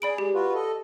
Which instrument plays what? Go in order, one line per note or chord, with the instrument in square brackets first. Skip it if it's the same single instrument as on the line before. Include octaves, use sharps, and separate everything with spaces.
[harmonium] G#4 [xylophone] D5 B5 D7
[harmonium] G#3 [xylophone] G4
[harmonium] F4 F#4 B4
A4 D#5